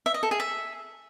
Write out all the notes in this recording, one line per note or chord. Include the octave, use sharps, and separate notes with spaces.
E5
D#5
A4
G#4
E5